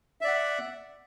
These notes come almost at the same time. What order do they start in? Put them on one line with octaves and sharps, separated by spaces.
E5 D5 F#5